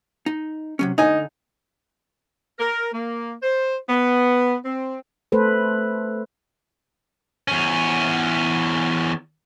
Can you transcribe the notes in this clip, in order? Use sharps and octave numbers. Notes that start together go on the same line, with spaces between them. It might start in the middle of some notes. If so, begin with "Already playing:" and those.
D#4
C3 F#3 C#4
D3 D#4 G#5
A#4
A#3
C5
B3
C4
A3 A4 B4 C5
E2 C#4